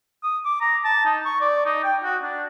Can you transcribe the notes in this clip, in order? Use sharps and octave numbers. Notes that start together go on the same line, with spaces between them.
D#6
D6
A#5
A5
D#4
C#6
D5
D#4
G5
F#4
D4